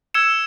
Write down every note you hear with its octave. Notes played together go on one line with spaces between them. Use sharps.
E6 G#6 C#7 E7